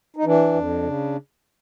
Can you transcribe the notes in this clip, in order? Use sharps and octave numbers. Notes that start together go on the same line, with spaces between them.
D#4
E3 D4
F2
C#3